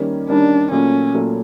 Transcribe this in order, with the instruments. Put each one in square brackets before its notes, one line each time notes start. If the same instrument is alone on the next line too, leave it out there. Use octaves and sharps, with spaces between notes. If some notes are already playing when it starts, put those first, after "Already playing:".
Already playing: [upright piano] D#3 G3 A#3 C#4
[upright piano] D#3 G3 A#3 C#4 [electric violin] D4
[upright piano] A#2 F#3 A3 [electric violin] C#4
[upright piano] A#2 F#3 A3